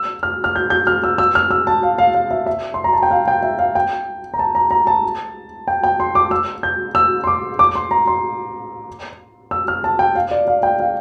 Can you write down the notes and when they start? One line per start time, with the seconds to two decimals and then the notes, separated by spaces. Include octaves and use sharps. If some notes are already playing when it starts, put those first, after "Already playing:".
Already playing: E6
0.23 F6
0.44 F6
0.56 G6
0.70 G6
0.87 F6
1.04 E6
1.18 E6
1.35 F6
1.51 E6
1.67 A5
1.83 F5
1.98 F5
2.14 F5
2.31 E5
2.46 E5
2.74 C6
2.84 A#5
2.93 A5
3.03 G5
3.11 F5
3.28 G5
3.43 E5
3.59 F5
3.75 G5
4.34 A#5
4.39 A5
4.55 A#5
4.71 A#5
4.87 A5
5.68 G5
5.84 G5
6.00 C6
6.15 D6
6.31 E6
6.63 G6
6.95 E6
7.24 C6
7.27 D6
7.59 D6
7.75 C6
7.91 A#5
8.07 C6
9.51 E6
9.68 F6
9.84 A5
9.99 G5
10.15 F5
10.31 D5
10.48 F5
10.63 G5
10.80 F5